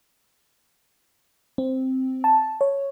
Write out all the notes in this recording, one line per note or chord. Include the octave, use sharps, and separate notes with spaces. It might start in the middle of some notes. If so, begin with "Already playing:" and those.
C4
A5
C#5